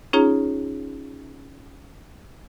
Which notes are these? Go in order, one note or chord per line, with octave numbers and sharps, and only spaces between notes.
C#4 D#4 F4 G#4 C#5 A#5